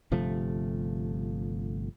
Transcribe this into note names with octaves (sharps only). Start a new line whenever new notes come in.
G1 C3 F3 A3